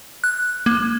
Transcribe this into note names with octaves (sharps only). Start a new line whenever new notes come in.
F#6
A#3